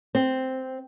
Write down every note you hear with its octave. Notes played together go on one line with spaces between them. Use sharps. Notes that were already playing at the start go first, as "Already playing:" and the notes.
C4